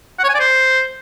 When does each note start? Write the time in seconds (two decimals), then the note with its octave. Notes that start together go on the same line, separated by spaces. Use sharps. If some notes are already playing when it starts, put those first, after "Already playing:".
0.19 F#5
0.24 C#5
0.29 G#5
0.34 D5
0.40 C5